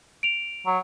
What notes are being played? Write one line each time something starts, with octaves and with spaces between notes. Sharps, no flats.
D7 F7
F#3